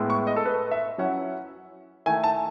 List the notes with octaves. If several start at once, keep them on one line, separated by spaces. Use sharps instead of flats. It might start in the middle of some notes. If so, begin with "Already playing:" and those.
Already playing: A2 G#3 B3 E4
C#6
D#5
A4
B4
E5
F#3 C#4 E4 F#5
D#3 A3 E4 G#5
A5